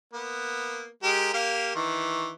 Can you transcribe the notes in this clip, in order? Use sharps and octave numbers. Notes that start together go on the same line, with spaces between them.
A#3 B3
G#3 G4 A#4
A#3 G4 F5
D#3 E3